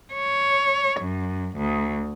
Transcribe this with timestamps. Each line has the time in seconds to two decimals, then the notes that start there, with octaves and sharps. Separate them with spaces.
0.13 C#5
1.00 F#2
1.57 D2